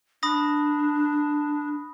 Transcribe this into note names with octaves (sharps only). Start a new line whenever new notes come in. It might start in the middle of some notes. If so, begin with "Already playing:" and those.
D4 B5 D#6 A#6